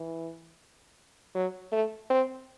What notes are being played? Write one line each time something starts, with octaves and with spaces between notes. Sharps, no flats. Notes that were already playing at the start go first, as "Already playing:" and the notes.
Already playing: E3
F#3
A3
C4